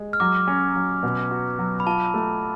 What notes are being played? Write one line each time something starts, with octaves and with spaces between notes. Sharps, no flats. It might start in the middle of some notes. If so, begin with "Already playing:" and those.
Already playing: G#3
F6
F#3 D6
C#4
F#3
B2
F#4
F#3
B5
F4 A5
A3